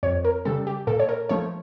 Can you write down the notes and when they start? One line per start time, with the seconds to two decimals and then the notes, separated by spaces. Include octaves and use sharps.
0.03 F2 C#5
0.25 A#4
0.45 C#3 G3 A4
0.67 G4
0.87 A#2 A4
0.99 C#5
1.09 A#4
1.29 F3 A3 C#5